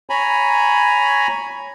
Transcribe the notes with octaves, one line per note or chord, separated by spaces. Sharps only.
C#5 G#5 A#5 B5